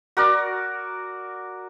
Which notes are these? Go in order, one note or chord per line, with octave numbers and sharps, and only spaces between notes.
F#4 A#4 D5